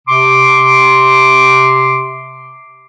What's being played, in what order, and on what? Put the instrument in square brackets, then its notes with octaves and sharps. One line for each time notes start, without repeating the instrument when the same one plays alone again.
[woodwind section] C3 C6 D6